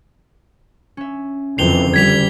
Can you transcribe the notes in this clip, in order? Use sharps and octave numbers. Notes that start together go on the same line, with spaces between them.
C#4 E5
F#1 F2 D3 E3 G5 C7 F7 G7
G3 G#6 B6 F7